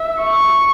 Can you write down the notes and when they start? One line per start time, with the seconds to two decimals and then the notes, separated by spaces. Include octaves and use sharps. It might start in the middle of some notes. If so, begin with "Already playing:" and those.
Already playing: E5
0.20 C#6